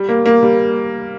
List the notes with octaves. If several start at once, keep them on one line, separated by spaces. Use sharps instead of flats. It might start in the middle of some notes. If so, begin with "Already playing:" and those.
Already playing: G3
A#3
A#3
G3